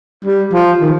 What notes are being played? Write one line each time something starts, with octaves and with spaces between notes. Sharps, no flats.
G3
F3
D#3